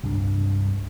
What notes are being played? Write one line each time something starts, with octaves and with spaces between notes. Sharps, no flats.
C2 G2 G#3 D4